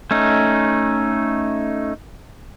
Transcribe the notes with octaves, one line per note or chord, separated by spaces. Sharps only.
A3 C#4 D#4